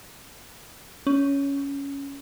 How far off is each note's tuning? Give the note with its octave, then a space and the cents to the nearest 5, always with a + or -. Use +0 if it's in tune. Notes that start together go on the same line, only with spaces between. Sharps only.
C#4 +10